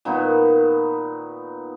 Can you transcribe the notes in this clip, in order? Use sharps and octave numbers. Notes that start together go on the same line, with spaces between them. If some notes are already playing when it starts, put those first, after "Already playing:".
A#2 D#3 B3 D#4